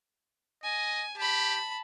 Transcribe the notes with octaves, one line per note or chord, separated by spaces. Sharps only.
D#5 G#5
G4 A5 B5